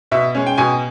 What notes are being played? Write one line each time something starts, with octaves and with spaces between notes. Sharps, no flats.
B2 E5
G#3 C#4
G5
B2 G#5